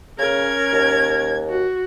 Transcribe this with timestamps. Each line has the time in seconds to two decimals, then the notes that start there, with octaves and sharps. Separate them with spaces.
0.19 C#3 C#4 A#4 G#6
0.72 D#2
1.49 F#4